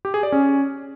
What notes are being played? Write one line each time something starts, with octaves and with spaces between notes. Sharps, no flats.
G4
G#4
D5
C#4